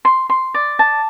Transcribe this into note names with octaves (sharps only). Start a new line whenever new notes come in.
C6
C6
D5
A5